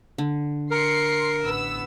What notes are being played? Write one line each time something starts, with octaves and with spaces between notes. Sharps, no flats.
D3
A#4 C6 C7 C#7
A1 B3 E6